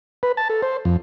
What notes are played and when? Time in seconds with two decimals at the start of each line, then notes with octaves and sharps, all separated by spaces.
0.23 B4
0.37 A5
0.50 A4
0.62 C5
0.85 F2